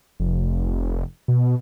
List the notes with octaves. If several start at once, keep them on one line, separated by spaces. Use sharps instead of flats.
F1
B2